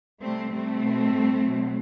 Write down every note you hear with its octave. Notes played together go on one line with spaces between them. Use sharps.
C3 G3 A3 C4
C3 G3 A3 C4
B2 F#3
A2 G3
B2 F#3